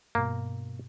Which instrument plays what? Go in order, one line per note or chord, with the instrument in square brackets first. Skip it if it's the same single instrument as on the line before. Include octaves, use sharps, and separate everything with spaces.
[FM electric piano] G2 B2 [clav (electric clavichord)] A#3